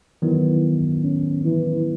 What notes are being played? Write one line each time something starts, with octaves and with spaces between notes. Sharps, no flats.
D#3 E3 F#3 B3
C#4
E3